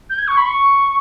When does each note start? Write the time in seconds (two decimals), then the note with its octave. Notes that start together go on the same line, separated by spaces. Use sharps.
0.10 G6
0.18 G#6
0.28 C#6
0.37 B5
0.46 C#6